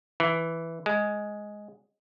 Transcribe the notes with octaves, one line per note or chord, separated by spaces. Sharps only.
E3
G#3